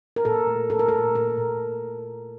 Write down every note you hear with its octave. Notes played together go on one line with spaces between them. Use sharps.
A#4
A#2 A4
A3
A#2 A4
A#4
A#2 A4
A#2 A#4
A#2